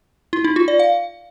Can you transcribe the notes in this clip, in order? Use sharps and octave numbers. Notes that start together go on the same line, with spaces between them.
E4
D#4
F4
D5
F5